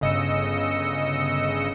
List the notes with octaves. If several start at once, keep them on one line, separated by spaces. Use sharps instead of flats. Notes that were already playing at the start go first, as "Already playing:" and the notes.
G1 C#3 D#5 E6 C#7